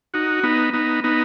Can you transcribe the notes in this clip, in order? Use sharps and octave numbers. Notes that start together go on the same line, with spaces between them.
D#4 F#4
B3 D#4
B3 D#4
B3 D#4